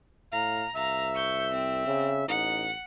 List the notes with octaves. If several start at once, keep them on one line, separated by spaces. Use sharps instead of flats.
A2 F5 A#5
C2 E5 F5 A#5
C#6 G6
C4
C#3
A1 D#4 F#5